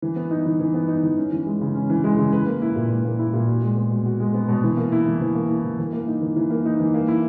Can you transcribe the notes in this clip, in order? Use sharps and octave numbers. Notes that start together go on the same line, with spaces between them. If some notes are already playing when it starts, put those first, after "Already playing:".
E3
B3
D#4
E3
E3
B3
D#4
E3
C#4
E3
G#3
C#3
C#4
E3
G#3
C#3
B4
A#3
E4
A#2
B4
A#3
E4
A#2
F#4
G#3
B3
B2
F#4
G#3
B3
B2
E3
A#3
E4
E3
E3
A#3
E4
E3
E3
A#3
D#4
E3
E3
A#3
D#4
E3
A#3
E4